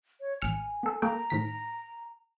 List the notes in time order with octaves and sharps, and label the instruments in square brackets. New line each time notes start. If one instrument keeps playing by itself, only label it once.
[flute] C#5
[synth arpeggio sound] A1 F6 C#7 [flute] G#5
[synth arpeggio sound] B3 A4
[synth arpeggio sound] A#3 A4 G5 [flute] A#5
[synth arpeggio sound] A2 D#3 B6